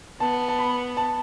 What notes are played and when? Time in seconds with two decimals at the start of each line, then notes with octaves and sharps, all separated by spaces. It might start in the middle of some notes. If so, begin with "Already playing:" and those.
0.20 B3 A5
0.48 A5
0.59 B5
0.97 A5